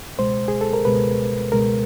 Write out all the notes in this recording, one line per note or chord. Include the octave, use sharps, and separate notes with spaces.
C#2 B2 G#3 C5
G#4
A4
A#4
C#2 B2 G#3 B4
C#2 B2 G#3 A#4